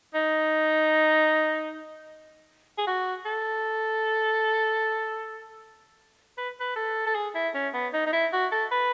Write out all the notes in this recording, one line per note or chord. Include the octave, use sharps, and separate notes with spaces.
D#4
G#4
F#4
A4
B4
B4
A4
A4
G#4
E4
C#4
B3
D#4
D#4
E4
F#4
A4
B4